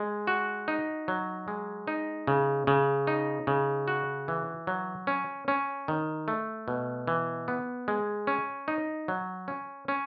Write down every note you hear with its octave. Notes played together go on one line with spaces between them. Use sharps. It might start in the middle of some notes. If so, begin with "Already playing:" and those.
Already playing: G#3
F#4
D#4
F#3
G#3
D#4
C#3
C#3
D#4
C#3
F#4
E3
F#3
C#4
C#4
D#3
A3
B2
E3
B3
G#3
C#4
D#4
F#3
C#4
C#4